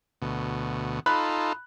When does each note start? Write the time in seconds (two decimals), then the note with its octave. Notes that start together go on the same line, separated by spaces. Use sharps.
0.22 D2 B2
1.06 D#4 F4 A4 B5 F#6